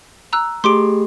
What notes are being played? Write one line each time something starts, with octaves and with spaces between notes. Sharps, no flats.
A#5 E6 F#6
A3 G4 G#4 C6 D6 D7